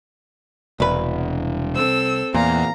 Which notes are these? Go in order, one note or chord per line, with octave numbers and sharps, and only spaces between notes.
E1 C2 B4
C4 A4 E6
E2 A#2 F5 A#5